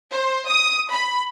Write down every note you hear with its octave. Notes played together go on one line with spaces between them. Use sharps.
C5
D#6
B5